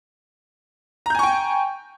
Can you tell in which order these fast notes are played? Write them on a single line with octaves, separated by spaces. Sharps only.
A#5 G6 G#5 C#6 G5